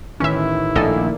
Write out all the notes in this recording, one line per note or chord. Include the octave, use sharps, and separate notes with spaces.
A1 D#3 C#4 E4 E5 C#7
A#1 A3 A#3 A4 D5 D#5